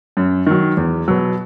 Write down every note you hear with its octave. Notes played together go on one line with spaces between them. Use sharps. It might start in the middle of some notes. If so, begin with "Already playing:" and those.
F#2
D#3 F#3
E2
B2 F#3